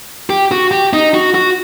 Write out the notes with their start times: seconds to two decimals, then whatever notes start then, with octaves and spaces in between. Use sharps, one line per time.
0.30 G4
0.51 F#4
0.71 G4
0.93 D#4
1.14 F#4
1.34 F#4